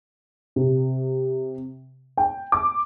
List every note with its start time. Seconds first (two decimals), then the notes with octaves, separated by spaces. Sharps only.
0.56 C3
2.17 G5
2.52 D6